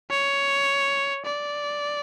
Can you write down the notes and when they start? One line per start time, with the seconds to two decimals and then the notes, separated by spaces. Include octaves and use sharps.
0.10 C#5
1.25 D5